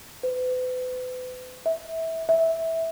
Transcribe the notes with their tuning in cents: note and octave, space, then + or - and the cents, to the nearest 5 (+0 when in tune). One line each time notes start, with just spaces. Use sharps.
B4 +40
E5 -20
E5 -15